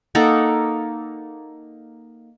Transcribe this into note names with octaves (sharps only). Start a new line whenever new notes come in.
A#3 D#4 A4 F#5